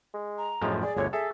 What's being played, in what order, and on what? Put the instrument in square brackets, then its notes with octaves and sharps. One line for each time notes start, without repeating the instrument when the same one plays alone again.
[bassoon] G#3
[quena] A#5
[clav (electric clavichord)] F#2 A2 F3 [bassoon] G#3
[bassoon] G#4 [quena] D5
[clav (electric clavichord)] G1 D2 D3 [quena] C#5
[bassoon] G#4 [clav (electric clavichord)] A4 [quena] E5